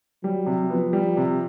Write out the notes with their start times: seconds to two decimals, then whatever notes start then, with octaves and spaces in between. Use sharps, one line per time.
0.24 F#3 G3
0.46 C3
0.70 F3 B3
0.93 G3
1.17 C3